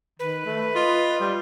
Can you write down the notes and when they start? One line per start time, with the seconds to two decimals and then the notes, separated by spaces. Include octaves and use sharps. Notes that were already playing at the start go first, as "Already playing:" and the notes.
0.19 D#3 B4
0.45 A3
0.76 F4 D#5
1.20 G3